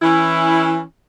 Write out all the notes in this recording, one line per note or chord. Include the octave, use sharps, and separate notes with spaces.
E3 C#4 E4